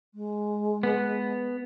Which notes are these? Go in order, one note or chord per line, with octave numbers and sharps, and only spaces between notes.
G#3
B3